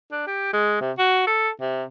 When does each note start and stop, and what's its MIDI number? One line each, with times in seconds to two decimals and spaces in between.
0.12 0.25 62
0.27 0.49 67
0.53 0.77 56
0.81 0.92 48
0.98 1.26 66
1.27 1.49 69
1.61 1.84 48